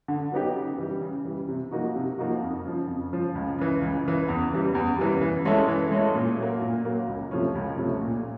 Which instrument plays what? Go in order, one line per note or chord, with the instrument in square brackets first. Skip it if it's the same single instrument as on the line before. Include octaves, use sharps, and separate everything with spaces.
[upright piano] D3
F#3 B3 D#4 G4
C#3
E3 G3
C#3
E3 G3
C3
F3 A#3 D#4 F#4
C3
F3 A#3 D#4 F#4
F2
C#3 F3
F2
C#3 F3
C#2
C#3 E3
C#2
C#3 E3
E2
C#3 E3 G3
E2
C#3 E3 G3
E3
G#3 C#4 E4 A4
E3
G#3 C#4 E4 A4
A#2
F#3 A#3
A#2
F#3 A#3
C#2
C3 F3 A3 C#4
C#2
C3 F3 A3 C#4
A#2